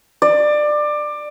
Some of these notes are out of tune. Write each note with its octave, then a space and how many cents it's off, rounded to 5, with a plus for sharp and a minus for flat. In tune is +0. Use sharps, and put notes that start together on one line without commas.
D5 +20